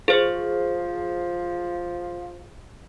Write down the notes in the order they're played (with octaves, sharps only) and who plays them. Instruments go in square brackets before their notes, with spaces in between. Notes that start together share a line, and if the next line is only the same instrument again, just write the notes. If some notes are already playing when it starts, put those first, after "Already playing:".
[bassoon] F3 [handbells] G#4 C5